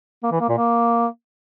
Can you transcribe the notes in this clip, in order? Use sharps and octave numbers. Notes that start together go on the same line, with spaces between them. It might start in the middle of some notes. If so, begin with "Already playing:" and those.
A#3
E3
A#3
A#2
A#3